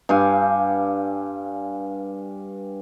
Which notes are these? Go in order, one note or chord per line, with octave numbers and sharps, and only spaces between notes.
G2 F5 G#5